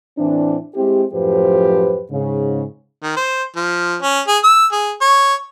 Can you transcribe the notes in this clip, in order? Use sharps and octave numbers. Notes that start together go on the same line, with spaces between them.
A2 E3 C4 D4
G#3 C4 E4 G4
F#2 A2 F3 G4 B4 C5
G#2 C#3
D#3
C5
F3
C#4
G#4
E6
G#4
C#5